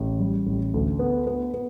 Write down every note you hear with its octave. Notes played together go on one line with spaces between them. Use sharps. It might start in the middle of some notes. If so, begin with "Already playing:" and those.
Already playing: A1
G3
A1
D2
B3
B3
B3